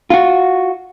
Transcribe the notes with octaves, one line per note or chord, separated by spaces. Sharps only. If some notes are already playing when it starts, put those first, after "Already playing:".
F4 F#4